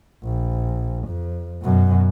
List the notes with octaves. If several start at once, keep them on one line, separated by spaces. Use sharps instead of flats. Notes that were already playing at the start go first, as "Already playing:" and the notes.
A#1
F2
F#2 B2